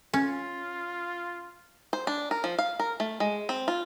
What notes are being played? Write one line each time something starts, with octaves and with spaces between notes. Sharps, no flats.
C#4 F4
C5
D4
A#4
F3
F5
A#4
A3
G#3
C4
F4